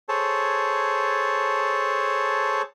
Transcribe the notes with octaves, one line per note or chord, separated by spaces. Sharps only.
G#4 A4 C5 C#5 A5